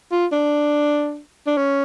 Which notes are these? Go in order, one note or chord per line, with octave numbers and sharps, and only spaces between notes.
F4
D4
D4
C#4